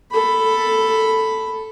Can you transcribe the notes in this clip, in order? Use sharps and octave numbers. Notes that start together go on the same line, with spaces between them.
A4 B5